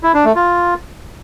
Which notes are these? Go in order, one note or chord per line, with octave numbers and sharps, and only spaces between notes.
E4
D4
A3
F4